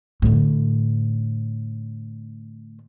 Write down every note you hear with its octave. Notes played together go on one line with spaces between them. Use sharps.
A2 D3